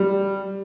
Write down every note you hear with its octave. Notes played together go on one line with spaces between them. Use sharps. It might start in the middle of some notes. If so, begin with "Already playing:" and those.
Already playing: G3